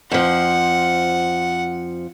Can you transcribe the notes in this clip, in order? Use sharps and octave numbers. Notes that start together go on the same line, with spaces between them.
F2 F3 F#5